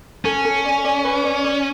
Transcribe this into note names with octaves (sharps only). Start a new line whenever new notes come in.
C#4 A4
A4
D5
D5
B4
D5
D5